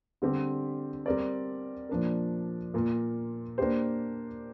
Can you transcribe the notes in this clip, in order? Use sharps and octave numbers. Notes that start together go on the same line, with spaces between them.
D3 G3 C4 G4
G3 C4 A#4 D5
A#2 F3 D4 A#4
A#2 A#3 F4 A#4
A#3 D4 G4 C5